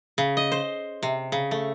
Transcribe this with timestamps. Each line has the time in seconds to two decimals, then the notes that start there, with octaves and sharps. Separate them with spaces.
0.18 C#3
0.37 D#5
0.52 C5
1.03 C3
1.32 C#3
1.51 A3